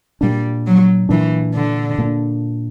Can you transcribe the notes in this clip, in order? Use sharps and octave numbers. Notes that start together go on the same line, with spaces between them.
A#2 G3 A#3 D4
F#3
A#2 E3 A#3 D4
D3
A#2 A#3 D4